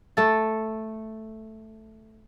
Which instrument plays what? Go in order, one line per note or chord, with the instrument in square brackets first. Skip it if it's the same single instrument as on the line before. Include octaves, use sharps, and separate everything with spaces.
[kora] A3 A4